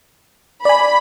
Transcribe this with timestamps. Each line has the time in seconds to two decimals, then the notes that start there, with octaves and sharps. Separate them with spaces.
0.65 D5 G#5 B5